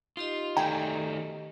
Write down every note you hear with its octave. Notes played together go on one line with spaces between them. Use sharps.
D#4 F4 G4 D#5
D#3 A3 G5 G#5 A#5